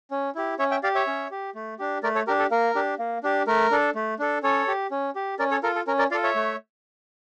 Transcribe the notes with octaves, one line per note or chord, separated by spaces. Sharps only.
C#4
E4 G4
C#4 C#5 E5
E5 G5
G4 D5 F5
C#5 E5
C#4
G4
A3
D4 G4
A3 A#4 D5
A4 C#5
D4 G4 A#4
A4
A#3 A#4
D4 G4
A#3
D4 G4
A3 A#4
D4 A4
A3
D4 A4
C#4 A4 C#5
G4
C#4
G4
C#4 A#4 D5
A4 C#5
F4 A4 A#4
A4
C#4 A#4
A#4 D5
F4 A4 D5 F5
C#5 E5
A3